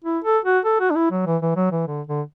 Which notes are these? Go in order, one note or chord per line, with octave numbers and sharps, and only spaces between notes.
E4
A4
F#4
A4
F#4
D4
E4
F#3
E3
E3
F#3
E3
D3
D3